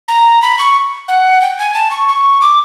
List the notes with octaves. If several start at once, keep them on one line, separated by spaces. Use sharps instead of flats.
A#5
B5
C#6
F#5
G5
G#5
A5
C#6
C#6
D6